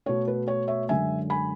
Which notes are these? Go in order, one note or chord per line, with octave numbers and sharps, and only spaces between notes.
B2 A3 C#5
B4
C#5
C#5 E5
F#2 D3 G#3 E5 G#5
G#5 B5